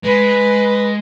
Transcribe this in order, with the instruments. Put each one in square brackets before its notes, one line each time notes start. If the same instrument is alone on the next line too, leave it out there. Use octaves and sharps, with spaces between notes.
[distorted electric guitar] G#3 [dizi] B4